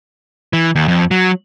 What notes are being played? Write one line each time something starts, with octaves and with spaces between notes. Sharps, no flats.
E3
D#2
F2
F#3